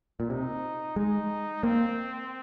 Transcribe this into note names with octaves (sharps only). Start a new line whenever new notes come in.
A#2
C3 D#4
G#3 D#4
A#3 C4